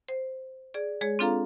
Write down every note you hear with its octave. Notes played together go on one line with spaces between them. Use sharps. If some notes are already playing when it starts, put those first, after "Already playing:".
C5
G#4 D5
G#3 G#4 C#5
C4 D4 F4 A4 F5 A#5